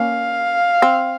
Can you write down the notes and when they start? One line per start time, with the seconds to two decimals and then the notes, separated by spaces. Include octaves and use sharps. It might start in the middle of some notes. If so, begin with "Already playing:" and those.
Already playing: A#3 C#4 F5
0.82 C4